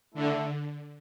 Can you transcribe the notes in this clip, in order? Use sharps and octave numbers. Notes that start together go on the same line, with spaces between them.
D3 A3 E4 A4